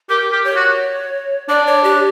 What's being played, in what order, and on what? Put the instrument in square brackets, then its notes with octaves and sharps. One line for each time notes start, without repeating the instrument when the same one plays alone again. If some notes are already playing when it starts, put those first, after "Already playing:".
[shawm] G4 [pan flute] A#4
[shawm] G4
[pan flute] C#5
[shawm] F#4
[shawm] D4 [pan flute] D5
[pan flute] C#5
G4